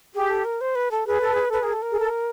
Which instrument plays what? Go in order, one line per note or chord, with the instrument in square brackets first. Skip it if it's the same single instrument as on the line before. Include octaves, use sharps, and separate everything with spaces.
[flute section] G4 [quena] G#4
[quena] A4
A#4
C5
B4
A4
[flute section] G#4 [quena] B4
[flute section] A4
G#4
[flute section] A4 [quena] B4
[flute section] G#4 [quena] A#4
[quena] A4
A#4
[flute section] G#4
A4